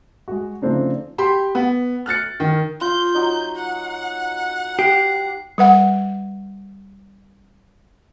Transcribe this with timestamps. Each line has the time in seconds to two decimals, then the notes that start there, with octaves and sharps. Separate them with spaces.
0.28 G#3 F#4
0.62 C#3 F3 A3 C4 D4 D#4
1.18 G4 B5 C6
1.55 B3
2.06 F6 F#6 A6 C#7
2.40 D#3
2.81 F4 G6
3.15 F#3 D#4 D#5
3.57 F#5
4.79 G4 C7
5.58 G3 B4 F#5